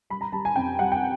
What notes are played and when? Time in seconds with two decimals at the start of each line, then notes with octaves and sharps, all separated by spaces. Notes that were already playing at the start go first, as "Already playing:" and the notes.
0.10 G3 B5
0.21 A#5
0.33 G3 A5
0.45 G#5
0.56 F2 G5
0.79 G3 F#5
0.92 G5